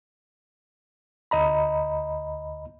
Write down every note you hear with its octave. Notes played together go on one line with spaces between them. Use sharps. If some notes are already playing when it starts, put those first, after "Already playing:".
D2 D#5 A#5 B5